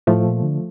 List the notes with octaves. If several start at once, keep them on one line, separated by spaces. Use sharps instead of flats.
A2 F3 A3
A#2
D3